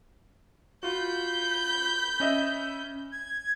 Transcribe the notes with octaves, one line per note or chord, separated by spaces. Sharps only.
F4 F#4 B5 G6
C#4 D#5 E5
G#6